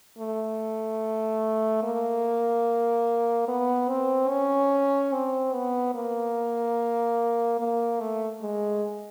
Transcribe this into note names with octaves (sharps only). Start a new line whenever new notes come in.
A3
A#3
B3
C4
C#4
C4
B3
A#3
A#3
A3
G#3